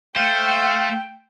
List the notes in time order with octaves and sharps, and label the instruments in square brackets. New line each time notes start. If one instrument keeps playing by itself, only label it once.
[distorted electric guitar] A3 [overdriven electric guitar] C5 [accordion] F5 E6 [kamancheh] G5